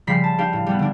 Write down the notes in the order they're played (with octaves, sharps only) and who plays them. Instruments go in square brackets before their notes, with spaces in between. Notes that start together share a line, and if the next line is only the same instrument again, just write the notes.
[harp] C#3 F3 G3 B5 B6 C7
A5
D4 G4 F5
A2
G3 B3
D3 D4